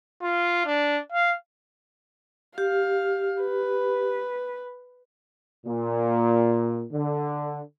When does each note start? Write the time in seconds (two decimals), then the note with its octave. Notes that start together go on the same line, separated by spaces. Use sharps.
0.22 F4
0.66 D4
1.12 F5
2.58 G4 F5
3.43 B4
5.66 A#2
6.93 D3